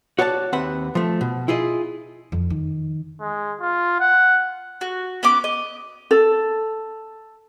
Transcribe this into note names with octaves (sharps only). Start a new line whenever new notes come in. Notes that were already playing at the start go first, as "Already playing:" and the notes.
F#4 C#5 D5 G#5 A5
D#2 C4 B4 E5 F#5
F3 A3
B2
E4 F4 G#4 D#5
F2
D#3
G#3
F4
F#5
F#4
B3 C#4 D6
D#5
A4